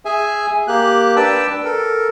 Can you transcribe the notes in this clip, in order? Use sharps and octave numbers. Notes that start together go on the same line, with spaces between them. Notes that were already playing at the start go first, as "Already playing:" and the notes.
G#4 E5 G#5
A#3 G4 F#6
D4 B4 G5 A5 E6
A4 A#4